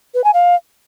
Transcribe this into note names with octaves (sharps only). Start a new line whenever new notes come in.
B4
G#5
F5